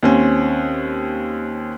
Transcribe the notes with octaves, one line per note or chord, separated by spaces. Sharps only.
D#2 C4 C#4